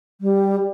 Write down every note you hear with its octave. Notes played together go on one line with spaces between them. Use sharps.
G3